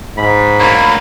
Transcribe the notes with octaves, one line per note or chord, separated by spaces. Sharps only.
G#2 B5
D2 A#3 C#5 B5